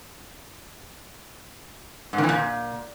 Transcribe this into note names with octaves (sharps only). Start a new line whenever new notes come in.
G#2
D#3
E3
A#2